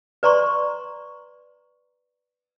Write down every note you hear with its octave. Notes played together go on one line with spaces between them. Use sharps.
B4 D5 A#5 C6 C#6